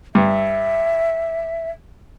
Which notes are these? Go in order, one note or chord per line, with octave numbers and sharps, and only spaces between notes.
G2 E5